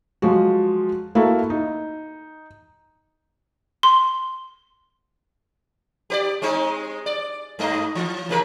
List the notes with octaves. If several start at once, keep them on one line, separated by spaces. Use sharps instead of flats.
F3 F#3 G#3 F#4
A#3 E4 F#4 A4
D#4
C6
G4 B4 D5
G#3 C4 D#4
D5
G2 A3 D#5
E3
D#2 C#3 A#4